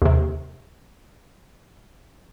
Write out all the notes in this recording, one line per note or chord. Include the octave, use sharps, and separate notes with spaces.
D#2 C3